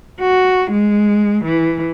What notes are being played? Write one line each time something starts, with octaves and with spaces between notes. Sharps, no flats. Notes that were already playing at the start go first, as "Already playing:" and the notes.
F#4
G#3
E3